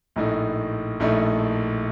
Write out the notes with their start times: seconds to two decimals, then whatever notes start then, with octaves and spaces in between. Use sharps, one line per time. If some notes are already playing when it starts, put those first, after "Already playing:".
0.16 A#1 A2 A3 D#4
1.00 A#1 A2 A3 D#4